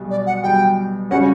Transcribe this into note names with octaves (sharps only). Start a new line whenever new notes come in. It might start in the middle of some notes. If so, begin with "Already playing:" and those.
Already playing: B1 B2 G3
D5
F#5
B1 B2 G3 G5
C#3 G3 C#4 F#4 F#5